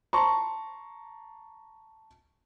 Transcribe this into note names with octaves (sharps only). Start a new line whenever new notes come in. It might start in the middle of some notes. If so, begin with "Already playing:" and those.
A5 A#5 C6 C#6